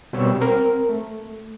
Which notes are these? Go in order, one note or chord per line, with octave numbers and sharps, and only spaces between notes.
B2 G3 C4 G4 C#5 E6
C4 A#4
A3